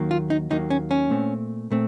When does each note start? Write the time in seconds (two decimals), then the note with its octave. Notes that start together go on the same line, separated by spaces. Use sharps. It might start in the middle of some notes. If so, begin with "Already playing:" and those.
Already playing: D#2 D#3 F#3 A#3
0.11 F4
0.30 D#4
0.50 D#2 D#3 F#3 A#3 D#4
0.70 C#4
0.91 C#4
1.10 A#2 A3 C4
1.71 A#2 A3 C4